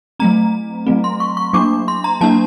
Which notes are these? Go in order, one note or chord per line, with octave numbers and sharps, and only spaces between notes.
F#3 A3 C4 A#5
F#3 A3 C4
C6
C#6
C#6
F#3 A#3 D4 D6
C6
A#5
F#3 A#3 D4 A5